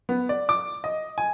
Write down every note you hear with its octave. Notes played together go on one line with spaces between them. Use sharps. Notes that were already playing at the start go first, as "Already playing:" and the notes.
B3
D5
D6
D#5
G#5